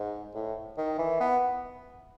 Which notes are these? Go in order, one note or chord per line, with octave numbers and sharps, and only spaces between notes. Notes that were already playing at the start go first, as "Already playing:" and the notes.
Already playing: G#2
A2
D#3
E3
B3